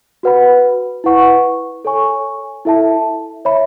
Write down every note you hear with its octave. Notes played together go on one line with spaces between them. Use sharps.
F#4 B4 F#5 B5
E4 B4 F#5 C#6
A4 C#5 G#5 C#6
E4 A4 E5 A5
C#5 E5 B5